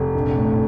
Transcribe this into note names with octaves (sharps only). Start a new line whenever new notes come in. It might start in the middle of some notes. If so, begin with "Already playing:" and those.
Already playing: F1
A#1
A2